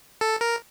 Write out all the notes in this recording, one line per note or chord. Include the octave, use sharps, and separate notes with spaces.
A4
A#4